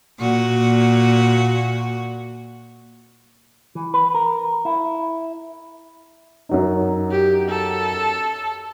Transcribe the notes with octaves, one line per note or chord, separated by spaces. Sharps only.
A#2 F#4
E3
B4
A#4
E4
F#2 F#3 D#4
G4
A4